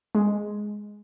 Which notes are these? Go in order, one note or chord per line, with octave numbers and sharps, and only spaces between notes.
G#3